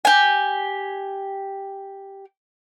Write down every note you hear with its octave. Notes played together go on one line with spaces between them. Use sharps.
G4 G#5